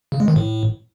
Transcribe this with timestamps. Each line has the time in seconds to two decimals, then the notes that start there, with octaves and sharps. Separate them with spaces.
0.12 C#3
0.20 G#3
0.28 D#3
0.36 A2